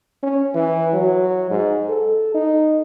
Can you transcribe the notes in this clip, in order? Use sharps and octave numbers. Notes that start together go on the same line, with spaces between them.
C#4
E3
F#3
G#2
A4
D#4